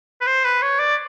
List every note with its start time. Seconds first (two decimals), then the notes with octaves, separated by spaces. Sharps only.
0.21 B4
0.26 C5
0.44 B4
0.62 C#5
0.79 D5